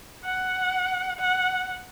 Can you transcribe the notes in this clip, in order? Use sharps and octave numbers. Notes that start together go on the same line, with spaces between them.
F#5
F#5